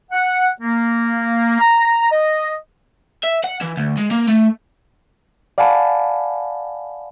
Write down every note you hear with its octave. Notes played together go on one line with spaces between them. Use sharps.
F#5
A#3
A#5
D#5
E5
F#5
E3
D2
G#3
A#3
A3
D5 F5 F#5 G#5 A5 B5